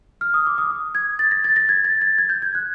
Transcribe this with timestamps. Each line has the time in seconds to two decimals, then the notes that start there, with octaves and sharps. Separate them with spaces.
0.21 F6
0.34 D#6
0.47 D6
0.58 D#6
0.70 D#6
0.95 G#6
1.19 A6
1.31 A#6
1.44 A6
1.56 A#6
1.69 G#6
1.85 A6
2.01 A6
2.18 G#6
2.29 G6
2.42 G#6
2.55 F#6